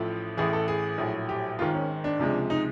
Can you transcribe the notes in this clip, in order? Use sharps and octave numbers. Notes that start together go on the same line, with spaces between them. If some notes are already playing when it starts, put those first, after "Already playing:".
Already playing: A1 A2 F3 A3
A1 A2 E3 G#4
A4
G#4
A#1 A2 F#3
G4
G#1 G#2 D#3 F4
C#4
D4
C#2 C3 F3 G#3
D#4